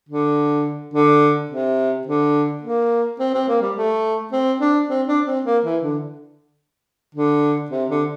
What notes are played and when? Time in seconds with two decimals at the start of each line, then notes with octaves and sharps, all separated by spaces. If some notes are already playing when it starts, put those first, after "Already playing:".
0.09 D3
0.94 D3
1.51 C3
2.07 D3
2.63 A#3
3.19 C4
3.34 C4
3.48 A#3
3.61 G3
3.76 A3
4.32 C4
4.60 D4
4.89 C4
5.07 D4
5.26 C4
5.45 A#3
5.64 E3
5.83 D3
7.15 D3
7.71 C3
7.90 D3